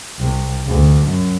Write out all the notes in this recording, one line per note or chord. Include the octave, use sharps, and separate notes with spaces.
C2
D2
F#2